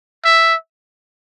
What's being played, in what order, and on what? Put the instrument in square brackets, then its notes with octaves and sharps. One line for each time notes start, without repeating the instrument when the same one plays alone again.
[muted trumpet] E5